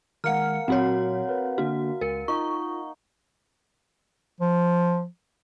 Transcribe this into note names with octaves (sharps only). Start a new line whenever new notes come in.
D#3 G#3 A#3 F#5 F6 C#7
A#2 F#3 C4 F#4 C#5 F#5
A#4 B4
D3 A#3 D4 F#4
C#2 A#4 C#7
D#4 F4 C#6
F3